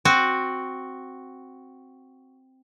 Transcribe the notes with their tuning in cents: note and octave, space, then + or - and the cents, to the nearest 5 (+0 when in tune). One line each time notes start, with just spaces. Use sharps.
C4 +0 F#4 +0